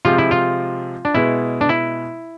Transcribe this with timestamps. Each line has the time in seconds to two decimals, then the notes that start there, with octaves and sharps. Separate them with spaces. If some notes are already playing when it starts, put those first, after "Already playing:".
0.05 C3 F3 G#3 C4 F4
0.18 E4
0.31 F4
1.05 D4
1.14 B2 G#3 B3 E4
1.61 D4
1.69 E4